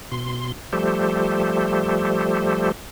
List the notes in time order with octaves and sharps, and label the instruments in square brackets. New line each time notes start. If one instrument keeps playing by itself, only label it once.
[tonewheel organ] B2 C6
F3 G3 A3 G4 A4 C5